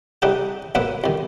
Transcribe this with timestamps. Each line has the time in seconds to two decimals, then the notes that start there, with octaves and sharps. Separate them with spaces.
0.22 C2 C3 D4 D#4 F#5 G5
0.75 B1 A2 A#3 B3 E4 F#5
1.04 C2 D#3